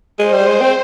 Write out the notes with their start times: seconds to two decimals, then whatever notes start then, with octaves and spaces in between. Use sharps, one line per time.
0.19 G#3 C5
0.33 G3
0.47 G#3
0.61 C4